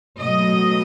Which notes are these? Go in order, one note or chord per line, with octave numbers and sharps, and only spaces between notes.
B2 F#3 A3 D#5